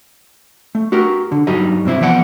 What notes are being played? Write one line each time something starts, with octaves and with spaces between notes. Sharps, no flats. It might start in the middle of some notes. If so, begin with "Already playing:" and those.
A3
F#4 G4 A#4
D3
G2 F#3 G3 D#4
G2 C3 C4 E4
E3 F3 B3 D5 F#5